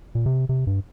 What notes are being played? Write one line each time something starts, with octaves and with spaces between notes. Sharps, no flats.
A#2
C3
C3
G2